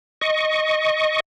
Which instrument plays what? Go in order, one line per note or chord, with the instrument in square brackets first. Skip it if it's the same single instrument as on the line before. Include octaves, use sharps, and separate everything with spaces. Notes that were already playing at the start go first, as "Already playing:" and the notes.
[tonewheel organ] D#5 C#6